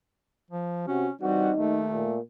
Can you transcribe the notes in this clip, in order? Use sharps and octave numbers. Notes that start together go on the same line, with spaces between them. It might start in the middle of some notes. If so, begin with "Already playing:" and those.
F3
C3 C#4 F#4
E3 G3 C4 D#4 F#4
D#2 D#3 A3
A#2